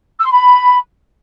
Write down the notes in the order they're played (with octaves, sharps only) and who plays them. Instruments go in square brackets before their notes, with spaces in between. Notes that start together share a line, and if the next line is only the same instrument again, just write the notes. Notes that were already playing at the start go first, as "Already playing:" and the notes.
[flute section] E6
C6
B5